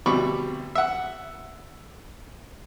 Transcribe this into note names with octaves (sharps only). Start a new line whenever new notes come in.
D2 B2 G3 B5 C#6 D6
E5 F#5